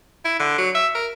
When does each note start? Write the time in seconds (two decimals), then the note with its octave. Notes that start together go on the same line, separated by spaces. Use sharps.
0.25 E4
0.40 D3
0.58 F#3
0.75 E5
0.95 A#4